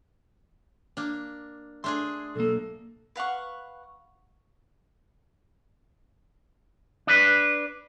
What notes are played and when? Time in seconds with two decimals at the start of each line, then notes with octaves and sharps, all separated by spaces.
0.97 A#3 D4
1.84 A3 D4 G#4 C6
2.36 B1 A#3 A4
3.16 B4 F5 F#5 C#6
7.07 D4 B4